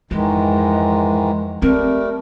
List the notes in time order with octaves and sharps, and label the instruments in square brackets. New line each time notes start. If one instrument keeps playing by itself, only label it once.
[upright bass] F2 [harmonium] G#2 D#3 E3 [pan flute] G#3
[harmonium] G3 A3 [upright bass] C4 [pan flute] A#4